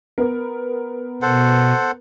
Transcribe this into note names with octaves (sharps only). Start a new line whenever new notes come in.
B3 A#4
B2 A4 C5 F#5